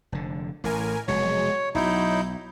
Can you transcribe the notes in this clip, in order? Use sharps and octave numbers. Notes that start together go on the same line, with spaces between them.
F1 D3
A1 A2 A#4 G#5
F1 B2 F#3 G#3 C#5
B1 F#3 D#4 E4 G6